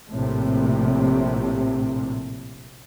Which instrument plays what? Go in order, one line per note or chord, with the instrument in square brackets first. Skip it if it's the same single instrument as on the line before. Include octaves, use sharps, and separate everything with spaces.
[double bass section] A#1 A2 C3